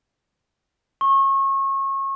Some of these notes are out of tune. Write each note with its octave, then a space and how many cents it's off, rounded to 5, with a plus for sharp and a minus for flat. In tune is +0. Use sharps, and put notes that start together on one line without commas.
C#6 -30